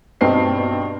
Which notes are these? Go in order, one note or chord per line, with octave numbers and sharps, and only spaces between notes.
G2 B2 C4 D#4 C7